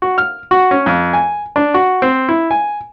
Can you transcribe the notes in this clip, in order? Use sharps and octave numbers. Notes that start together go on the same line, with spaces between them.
F#4
F6
F#4
C#4
F2
G#5
D4
F#4
C4
E4
G#5